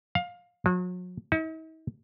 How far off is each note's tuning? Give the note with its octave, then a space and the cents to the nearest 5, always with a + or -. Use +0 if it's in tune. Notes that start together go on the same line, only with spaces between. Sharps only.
F5 +20
F#3 -40
D#4 +45